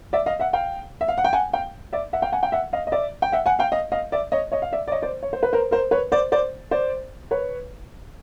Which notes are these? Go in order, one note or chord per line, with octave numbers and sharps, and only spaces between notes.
D5 E5
D#5 F5
E5 F#5
F5 G5
E5
F5
F#5
G5
F#5 G#5
F5 G5
D5 E5
E5 F#5
F5 G5
F#5 G#5
F5 G5
E5 F#5
D#5 F5
D#5
D5 E5
G5
E5 F#5
F#5 G#5
F5 G5
D#5 F5
D#5 F5
D5 E5
C#5 D#5
C#5 D#5
F5
D5 E5
D5
C#5 D#5
C5 D5
C#5
C5
B4
A#4 C5
A#4 C5
B4 C#5
C5 D5
C5 D5
C5 D5
B4 C#5